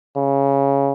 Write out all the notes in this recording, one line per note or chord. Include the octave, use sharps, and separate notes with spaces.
C#3